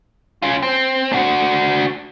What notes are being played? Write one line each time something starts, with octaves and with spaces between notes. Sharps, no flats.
C#4 F4
C4
D4 F#4